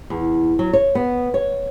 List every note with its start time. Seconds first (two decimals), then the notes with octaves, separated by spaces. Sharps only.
0.10 E2
0.59 F#3
0.73 C#5
0.95 B3
1.34 C#5